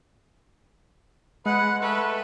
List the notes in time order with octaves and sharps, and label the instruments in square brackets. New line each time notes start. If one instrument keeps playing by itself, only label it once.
[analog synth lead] G#3 [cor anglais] B4 [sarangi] F#5
[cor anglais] A3 [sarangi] B4